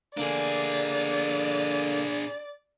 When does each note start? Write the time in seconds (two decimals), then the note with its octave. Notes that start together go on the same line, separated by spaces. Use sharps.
0.17 D3 A#3 D4 G#4 D5